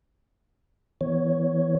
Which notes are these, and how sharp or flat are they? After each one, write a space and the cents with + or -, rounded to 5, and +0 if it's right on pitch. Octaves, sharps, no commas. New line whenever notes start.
E3 +0 B3 +0 C#5 +0